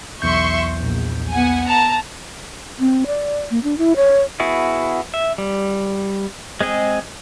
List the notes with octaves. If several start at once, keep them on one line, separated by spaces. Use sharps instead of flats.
B1 E2 E5 C6 C#6 G6
A#1
B3 F#5 G#5
A5 A#5
C4
D5
A#3
D4
E4
C#5
B3 E4 F#4 G#4
E5
G3
G#3 C4 G#4 D#5